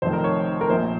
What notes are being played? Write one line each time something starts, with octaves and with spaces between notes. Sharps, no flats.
F1 F2 D#3 C5
A#4
C#5
A#4
A#1 A#2 F3 C5